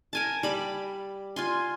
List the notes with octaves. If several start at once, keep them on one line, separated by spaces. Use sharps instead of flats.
A#4 G#5 A5
G3 B5 D6
F4 G#5 C6